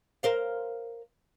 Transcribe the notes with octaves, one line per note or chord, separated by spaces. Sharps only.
A#4 C5 F5